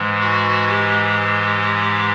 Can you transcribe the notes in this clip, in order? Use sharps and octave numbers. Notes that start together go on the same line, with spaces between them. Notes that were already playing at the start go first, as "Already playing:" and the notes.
Already playing: G#2 E3 G#3
F#4
G4